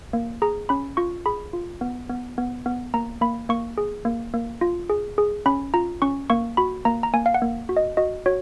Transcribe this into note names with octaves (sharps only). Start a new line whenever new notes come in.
A#3
G#4 A#5
C#4 B5
F4 C#6
G#4 B5
F4
B3
B3
B3
B3
A#3 A#5
A#3 B5
A#3 C#6
G#4
A#3
A#3
F4
G#4
G#4
C#4 B5
F4 A#5
C#4 C#6
A#3 C#6
F#4 B5
A#3 A#5
A#5
A#3 G#5
F5
F#5
A#3
F#4
D#5
F#4 D#5
F#4 C#5